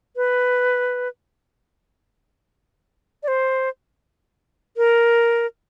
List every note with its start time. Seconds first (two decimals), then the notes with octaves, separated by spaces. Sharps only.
0.16 B4
3.23 D5
3.28 C5
4.77 A#4